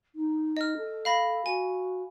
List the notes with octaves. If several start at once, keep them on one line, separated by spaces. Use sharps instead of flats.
D#4
D#5 F6
A4
F5 B5 A#6
F#4 G#5